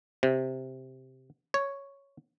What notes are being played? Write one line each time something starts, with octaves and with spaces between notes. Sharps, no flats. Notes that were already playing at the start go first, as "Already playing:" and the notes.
C3
C#5